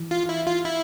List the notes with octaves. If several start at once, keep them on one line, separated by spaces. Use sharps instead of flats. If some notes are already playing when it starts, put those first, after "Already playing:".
Already playing: E3
F4
E4
F4
E4